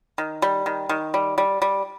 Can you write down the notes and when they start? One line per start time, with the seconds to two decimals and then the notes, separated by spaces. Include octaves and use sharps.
0.18 D#3
0.42 G3
0.66 D#3
0.89 D#3
1.14 G3
1.38 G3
1.62 G3